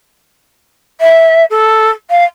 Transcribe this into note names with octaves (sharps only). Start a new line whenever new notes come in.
E5
A4
F5